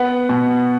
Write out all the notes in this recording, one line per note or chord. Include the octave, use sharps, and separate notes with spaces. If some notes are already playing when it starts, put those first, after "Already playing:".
Already playing: B3 F#5
B2